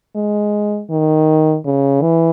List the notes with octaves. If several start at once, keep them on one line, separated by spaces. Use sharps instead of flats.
G#3
D#3
C#3
E3